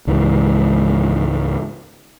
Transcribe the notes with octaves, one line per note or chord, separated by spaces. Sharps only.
C#2 G#2 E3